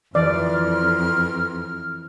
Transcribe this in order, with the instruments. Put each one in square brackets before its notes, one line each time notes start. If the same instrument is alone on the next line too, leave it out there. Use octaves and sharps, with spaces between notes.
[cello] F2 [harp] E3 [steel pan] D5 [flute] F6